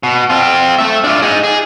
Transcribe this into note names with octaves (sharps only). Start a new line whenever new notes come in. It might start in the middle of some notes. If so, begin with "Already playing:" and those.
B2
C4 F4
A3 E5
D4 F4
D#4 G#4
G#4